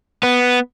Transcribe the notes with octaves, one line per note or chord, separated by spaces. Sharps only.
B3